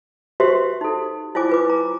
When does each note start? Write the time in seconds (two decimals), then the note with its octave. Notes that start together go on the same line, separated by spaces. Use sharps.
0.40 F#4 G4 B4 C5 E5 C6
0.81 D#4 A4
1.35 E4 F4 C5 G#5 D6
1.49 F4 B4 D6
1.70 A#5